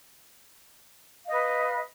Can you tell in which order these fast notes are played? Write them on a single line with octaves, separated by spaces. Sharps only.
F5 D#5 B4